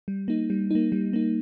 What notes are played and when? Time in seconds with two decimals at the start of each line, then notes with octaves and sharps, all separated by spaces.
0.08 G3
0.28 A#3 D#4
0.50 G3
0.71 A#3 D#4
0.92 G3
1.13 A#3 D#4